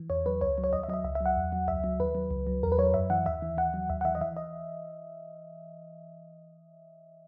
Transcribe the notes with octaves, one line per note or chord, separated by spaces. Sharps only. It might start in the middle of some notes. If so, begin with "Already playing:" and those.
Already playing: E3
E2 C#5
F#3 B4
C#2 C#5
F#3
C#5
D#2 D#5
E5
F#3 D#5
E5
C#2 E5
E5
F#3 F#5
E2
F#3
C#2 E5
F#3
D#2 B4
F#3
C#2
F#3
E2 A#4
B4
F#3 C#5
F#2 E5
E3 F#5
D#2 E5
E3
D#2 F#5
F#3
D#2 E5
F#5
E3 E5
D#5
E3 E5
D#5